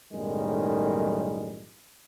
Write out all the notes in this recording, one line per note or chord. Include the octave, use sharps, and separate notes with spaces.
B1 F#2 A2 D#3 G3 G#3